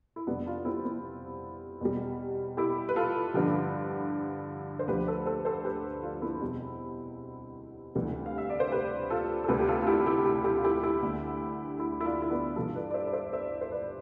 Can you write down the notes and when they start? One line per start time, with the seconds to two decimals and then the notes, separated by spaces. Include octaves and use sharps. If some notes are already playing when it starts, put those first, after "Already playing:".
0.16 E4
0.27 F2 C3 G3 B3 D4
0.46 D4 F4
0.65 C4 E4
0.85 C4 E4
1.81 E2 B2 G3
2.57 E4 G4
2.89 B4
2.96 F4 A4
3.34 G2 D3 F3 G4 B4
4.79 C5
4.87 D2 D3 F3 G4 B4
5.07 A4 C5
5.26 A4 C5
5.45 A4 C5
5.64 G4 B4
6.03 D4 F4
6.22 C4 E4
6.41 E2 B2 G3
7.95 D2 C3 E3 G3
8.26 F5
8.38 E5
8.50 D5
8.60 C5
8.72 G4 B4
9.10 F4 A4
9.44 A4
9.48 D2 C3 G3 G4 B4
9.59 G4
9.67 F4 A4
9.81 F4
9.87 E4 G4
10.06 E4 G4
10.25 E4 G4
10.44 E4 G4
10.56 F4
10.64 E4 G4
10.83 E4 G4
11.02 D2 D3 G3
11.79 E4 G4
12.01 E4
12.05 D4 F4
12.22 E4
12.30 B3 D4
12.55 G2 E3 G3 F4 A4
12.75 B4 D5
12.91 D5
12.94 C5 E5
13.07 D5
13.13 C5 E5
13.33 C5 E5
13.61 C5
13.71 B4 D5